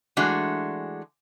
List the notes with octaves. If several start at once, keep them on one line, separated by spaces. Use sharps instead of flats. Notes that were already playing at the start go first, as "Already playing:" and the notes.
E3 G#3 A3 D4 F#4